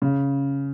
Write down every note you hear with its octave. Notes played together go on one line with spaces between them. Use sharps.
C#3